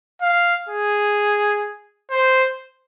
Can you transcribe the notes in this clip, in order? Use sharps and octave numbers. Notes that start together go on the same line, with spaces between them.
F5
G#4
C5